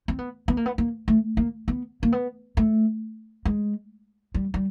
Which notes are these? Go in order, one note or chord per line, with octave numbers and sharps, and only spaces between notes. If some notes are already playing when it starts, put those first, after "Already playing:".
C4
B3
B3
A#3
B3
A#3
A3
A#3
B3
A#3
B3
A3
G#3
G3
G3